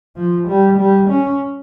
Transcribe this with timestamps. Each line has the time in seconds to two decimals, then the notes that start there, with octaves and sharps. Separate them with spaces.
0.16 F3
0.48 G3
0.78 G3
1.09 C#4